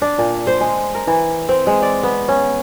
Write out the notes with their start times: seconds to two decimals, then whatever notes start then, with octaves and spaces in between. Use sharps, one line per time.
0.02 D4
0.18 A#2
0.47 C5
0.60 G#3
0.94 A#4
1.07 E3
1.49 C4
1.67 G#3
1.82 D5
2.03 B3
2.28 C#4